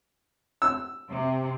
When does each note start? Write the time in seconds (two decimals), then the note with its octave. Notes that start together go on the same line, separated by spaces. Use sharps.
0.62 E6
1.10 C3